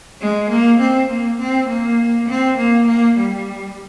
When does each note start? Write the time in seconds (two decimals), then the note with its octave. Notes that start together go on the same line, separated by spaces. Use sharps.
0.21 G#3
0.51 A#3
0.80 C4
1.09 A#3
1.40 C4
1.69 A#3
2.29 C4
2.58 A#3
2.88 A#3
3.19 G3